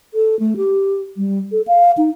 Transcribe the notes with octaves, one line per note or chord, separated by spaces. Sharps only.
A4
A3
G4
G3
A4
F5
D#4